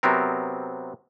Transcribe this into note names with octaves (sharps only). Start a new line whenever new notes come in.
C3 F#3 B3 C4 A#4